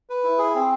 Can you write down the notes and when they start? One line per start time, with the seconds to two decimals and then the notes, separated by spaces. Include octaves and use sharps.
0.09 B4
0.24 E4
0.38 G#4
0.54 C4